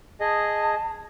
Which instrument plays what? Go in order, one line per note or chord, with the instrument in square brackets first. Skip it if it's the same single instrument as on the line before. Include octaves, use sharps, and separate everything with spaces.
[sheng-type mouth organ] G#4 D#5 [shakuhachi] A5